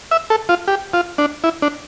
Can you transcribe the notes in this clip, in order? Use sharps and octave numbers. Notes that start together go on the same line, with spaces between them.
E5
A4
F4
G4
F4
D4
E4
D4